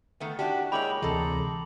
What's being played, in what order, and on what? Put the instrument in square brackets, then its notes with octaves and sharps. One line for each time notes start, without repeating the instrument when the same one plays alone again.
[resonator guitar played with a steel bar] D#3 A3 B3
[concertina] D4 [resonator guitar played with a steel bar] E4 F#4 G4 [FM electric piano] D5 A5
[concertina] G#3 E4 G5 [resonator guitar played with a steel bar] A#3 C#5 [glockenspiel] B5 D6 F#7
[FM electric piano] D2 C3 E3 [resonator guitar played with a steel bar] G#3 A4 [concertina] A#5